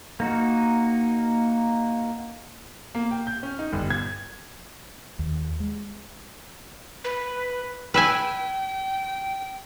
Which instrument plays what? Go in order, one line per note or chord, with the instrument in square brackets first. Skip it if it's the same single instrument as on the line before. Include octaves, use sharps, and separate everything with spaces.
[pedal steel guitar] A#3 D#4 F#4
[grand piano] A#3
G5
G6
C#4
D#4
G1
G#6
[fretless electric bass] D#2
G#3
[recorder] B4
[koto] B4 E5 G#5 [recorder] G5